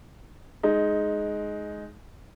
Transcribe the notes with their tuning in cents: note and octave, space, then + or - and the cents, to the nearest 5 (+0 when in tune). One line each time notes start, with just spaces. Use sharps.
G#3 +15 D#4 +0